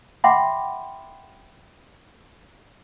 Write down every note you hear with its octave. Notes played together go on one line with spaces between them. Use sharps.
E5 F#5 G5 B5 C6 D6